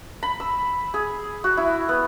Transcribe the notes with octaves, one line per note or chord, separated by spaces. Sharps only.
B5
E6
G#4
F#4
E4
B3